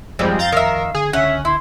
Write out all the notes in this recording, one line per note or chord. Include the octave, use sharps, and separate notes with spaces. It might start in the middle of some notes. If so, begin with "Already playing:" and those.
G#1 F#2 F3 G3 G#3 C4
F2 F5 A#5 G6 A6
D#3 A#4 E5
D3 G#4
C#2 D3 C#4 E5 F#5
E4 C6